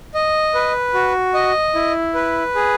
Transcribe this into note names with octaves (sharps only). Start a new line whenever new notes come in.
D#5
B4
F#4
D#5
E4
B4
G#4